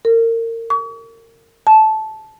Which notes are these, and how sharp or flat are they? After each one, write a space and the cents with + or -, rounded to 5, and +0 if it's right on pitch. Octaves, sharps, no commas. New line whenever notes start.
A#4 -30
C#6 +40
A5 -15